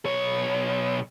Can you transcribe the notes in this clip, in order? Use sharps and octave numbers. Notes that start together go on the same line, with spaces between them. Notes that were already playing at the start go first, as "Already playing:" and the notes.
B1 C#5